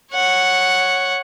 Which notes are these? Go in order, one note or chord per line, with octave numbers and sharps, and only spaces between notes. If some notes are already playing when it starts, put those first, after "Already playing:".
C#5 F#5